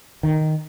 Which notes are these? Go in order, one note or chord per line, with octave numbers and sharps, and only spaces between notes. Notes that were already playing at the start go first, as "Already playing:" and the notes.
D#3